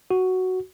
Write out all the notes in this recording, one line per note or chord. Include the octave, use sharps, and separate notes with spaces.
F#4